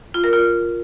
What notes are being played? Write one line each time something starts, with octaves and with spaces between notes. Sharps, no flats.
F4
A#4
F4